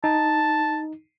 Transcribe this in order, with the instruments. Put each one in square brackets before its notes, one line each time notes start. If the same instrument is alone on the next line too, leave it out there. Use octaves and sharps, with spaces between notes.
[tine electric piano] D#4 [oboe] A5